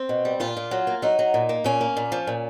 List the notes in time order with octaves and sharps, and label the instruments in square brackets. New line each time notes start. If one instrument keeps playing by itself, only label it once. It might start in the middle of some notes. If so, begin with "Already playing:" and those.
Already playing: [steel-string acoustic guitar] C4
B2
G3
A#2 F4
A#2
F#3
A#3
F#3 D#4
F#3
A#2
A#3
A#2 C#4
A#3
A#2
F3
A#2